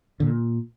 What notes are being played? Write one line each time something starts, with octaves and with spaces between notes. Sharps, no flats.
A#2 D3